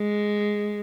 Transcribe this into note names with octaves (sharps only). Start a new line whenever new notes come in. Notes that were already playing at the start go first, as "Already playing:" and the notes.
Already playing: G#3